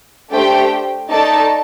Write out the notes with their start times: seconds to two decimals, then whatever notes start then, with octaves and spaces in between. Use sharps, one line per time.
0.32 A3 D4 G4 C5 G5
1.10 A3 D#4 A4 D5 A5